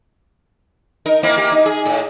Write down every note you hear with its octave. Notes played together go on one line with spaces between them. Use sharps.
D#4 A#4
A#3 C4 E4
A#3 G4
D#4
G#4
A2